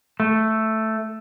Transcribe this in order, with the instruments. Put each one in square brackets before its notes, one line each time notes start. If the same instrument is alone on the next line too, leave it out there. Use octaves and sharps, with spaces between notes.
[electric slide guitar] A3